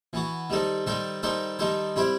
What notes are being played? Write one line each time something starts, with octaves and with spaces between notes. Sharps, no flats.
E3 B3 F#4
D#3 G3 D#4 A4 C5
D#3 G3 D#4 A4 C5
D#3 G3 D#4 A4 C5
D#3 G3 D#4 A4 C5
G3 C4 E4 G4 C5